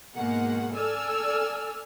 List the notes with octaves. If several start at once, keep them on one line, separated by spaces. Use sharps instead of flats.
G#2 B2 D#3 G#3 A#3 F#5
A4 D5 G#5 E6 F6